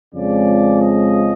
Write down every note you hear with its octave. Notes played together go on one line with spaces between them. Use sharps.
F2 C#3 F3 G#3 C4 D5
D#5